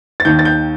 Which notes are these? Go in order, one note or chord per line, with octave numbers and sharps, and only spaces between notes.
A6
D#2 D#3 G6
A6
G6